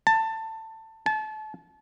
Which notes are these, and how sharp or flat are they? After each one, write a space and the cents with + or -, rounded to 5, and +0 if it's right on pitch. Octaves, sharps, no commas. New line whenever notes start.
A5 +20
A5 -30